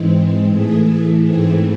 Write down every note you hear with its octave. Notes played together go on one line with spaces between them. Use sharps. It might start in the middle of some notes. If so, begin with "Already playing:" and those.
Already playing: G#2 E3 G#3 C4
A2 E3 A3 G#4
G#2 E3 A3 C4 G#4